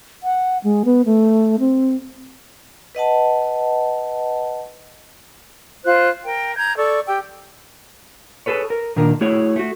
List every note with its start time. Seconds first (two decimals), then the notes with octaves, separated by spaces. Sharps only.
0.23 F#5
0.64 G#3
0.85 B3
1.06 A3
1.60 C4
2.95 B4 D#5 F#5 A5
5.84 F4 C5 F#6
6.24 A#4 G5
6.57 A#5 G6 G#6
6.77 A4 D5 C#6
7.07 G4 G5 E6
8.46 G#4 A4 B4 C#5
8.70 A#4
8.96 A#2 D#3 D4 A#4
9.21 A3 E4 F#4 G#4 C#5
9.56 A3 F#4